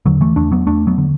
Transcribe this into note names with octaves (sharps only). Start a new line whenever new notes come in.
E2 D3 F#3
E3 A3
E2 A3 D4
F#3 B3
E2 A3 D4
F#3 B3
D3